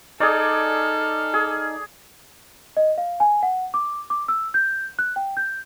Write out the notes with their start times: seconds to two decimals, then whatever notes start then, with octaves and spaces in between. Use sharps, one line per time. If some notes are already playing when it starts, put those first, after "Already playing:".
0.20 D#4 G#4 A4 D5 F6
1.34 G#4
2.77 D#5
2.98 F5
3.20 G#5
3.43 F#5
3.74 D6
4.10 D6
4.28 E6
4.54 G6
4.99 F#6
5.16 G5
5.37 G6